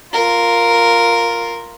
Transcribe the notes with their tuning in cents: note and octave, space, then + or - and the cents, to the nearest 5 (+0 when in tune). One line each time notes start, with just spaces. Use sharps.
F4 +0 A#4 +0